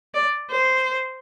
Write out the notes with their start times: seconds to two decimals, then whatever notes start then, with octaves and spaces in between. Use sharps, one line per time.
0.14 D5
0.51 C5